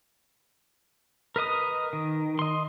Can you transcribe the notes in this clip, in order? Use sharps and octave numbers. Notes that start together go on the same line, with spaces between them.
A#4 B4 D#5 D#6
D#3
D#5 C6